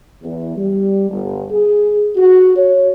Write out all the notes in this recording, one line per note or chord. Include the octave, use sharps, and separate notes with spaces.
E2
G3
G1
G#4
F#4
C#5